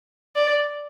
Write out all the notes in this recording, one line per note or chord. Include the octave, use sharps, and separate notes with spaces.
D5